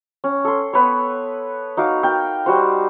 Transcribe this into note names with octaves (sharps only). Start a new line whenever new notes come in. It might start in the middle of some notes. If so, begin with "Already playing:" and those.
C#4
A4 C6
B3 B4 C#5
D#4 F#4 F5 D6
A#4 G5
G3 F#4 C5